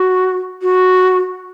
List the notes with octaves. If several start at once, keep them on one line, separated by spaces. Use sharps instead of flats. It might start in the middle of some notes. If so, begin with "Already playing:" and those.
Already playing: F#4
F#4